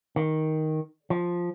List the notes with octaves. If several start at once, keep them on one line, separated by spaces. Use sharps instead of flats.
D#3
F3